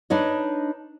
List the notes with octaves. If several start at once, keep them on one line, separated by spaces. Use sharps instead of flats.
D4 D#4 B4 C#5 D#5